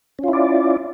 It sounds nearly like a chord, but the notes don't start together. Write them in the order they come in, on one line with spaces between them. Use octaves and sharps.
C#4 F4 E4 D5